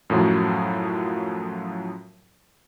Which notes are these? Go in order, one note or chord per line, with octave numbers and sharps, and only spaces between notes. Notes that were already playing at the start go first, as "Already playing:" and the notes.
F#2 A2 F3 F#3